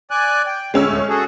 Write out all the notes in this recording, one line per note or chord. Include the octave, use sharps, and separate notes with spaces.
D5 G#5 F#6
G5
D3 G#3 C#4 E6
D2 A2 A3
F#4 G#4 A4